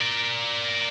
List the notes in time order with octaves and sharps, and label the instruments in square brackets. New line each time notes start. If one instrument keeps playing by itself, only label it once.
[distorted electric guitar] A#4 D5